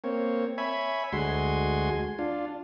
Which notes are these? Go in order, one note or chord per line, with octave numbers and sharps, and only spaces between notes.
A#3 C4 C#5
C#5 E5 G#5 B5
D2 G#3 F#4 G#5 C6
D4 F4